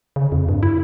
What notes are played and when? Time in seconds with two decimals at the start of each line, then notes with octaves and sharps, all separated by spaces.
0.16 C#3
0.32 F2
0.49 G2
0.63 E4